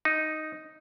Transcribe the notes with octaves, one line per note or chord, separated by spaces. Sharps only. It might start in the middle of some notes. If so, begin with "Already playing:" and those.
D#4